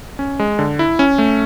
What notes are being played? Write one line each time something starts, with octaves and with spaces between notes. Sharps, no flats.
C#4
G#3
D3
E4
C#4
A3